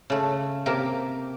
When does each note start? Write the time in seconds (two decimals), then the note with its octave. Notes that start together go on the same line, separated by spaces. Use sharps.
0.10 C#3 A3
0.66 C3 A#3 G4 A#4